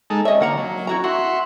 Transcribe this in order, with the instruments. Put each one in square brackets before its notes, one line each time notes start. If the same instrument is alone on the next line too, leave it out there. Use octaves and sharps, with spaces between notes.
[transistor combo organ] G#3 D#4 A4
[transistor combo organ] C#4 [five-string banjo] D#5 E5
[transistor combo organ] D3 [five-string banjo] A#3 F#5 A#5
[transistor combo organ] F#3
[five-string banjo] E4 F#4 A#5
[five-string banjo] F#4 [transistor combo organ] E5 F#5 C6